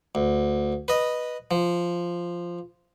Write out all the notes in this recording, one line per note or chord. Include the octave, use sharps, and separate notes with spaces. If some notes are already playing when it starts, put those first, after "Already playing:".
D2
B4 D#5
F3